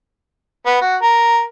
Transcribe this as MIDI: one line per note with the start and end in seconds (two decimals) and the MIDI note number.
0.66 0.80 59
0.81 0.96 66
1.02 1.43 70